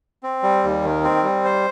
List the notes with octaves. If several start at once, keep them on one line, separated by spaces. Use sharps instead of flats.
C4
G3
D#2
D#3
C4
G3
C5